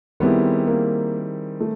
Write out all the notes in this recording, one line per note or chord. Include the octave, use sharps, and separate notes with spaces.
D#3 G3 B3 C4 E4 G#4
A#3
A3